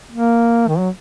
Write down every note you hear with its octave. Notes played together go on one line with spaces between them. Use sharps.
A#3
D#3
F#3